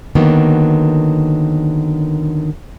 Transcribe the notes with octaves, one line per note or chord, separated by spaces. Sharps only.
D3 D#3 F#3 A#3 B3